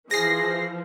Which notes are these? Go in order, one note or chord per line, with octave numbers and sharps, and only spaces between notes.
E3 F3 G#4 A#6 C7